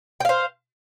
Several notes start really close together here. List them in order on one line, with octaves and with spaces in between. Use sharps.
G5 F5 C5